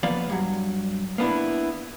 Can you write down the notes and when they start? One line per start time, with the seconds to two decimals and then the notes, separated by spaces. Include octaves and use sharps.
0.03 F3 A#3 B3 D5 F5
0.30 G2 F#3
1.18 A#3 B3 D4 E4